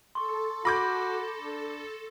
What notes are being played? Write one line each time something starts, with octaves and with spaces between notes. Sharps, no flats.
A4 C6 C#6
F#4 B5 D6 G6 A#6
D4